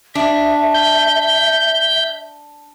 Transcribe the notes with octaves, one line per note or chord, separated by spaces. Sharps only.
D4 E5
G6